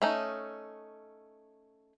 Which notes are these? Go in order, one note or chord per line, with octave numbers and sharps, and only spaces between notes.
A3 C#4 D#4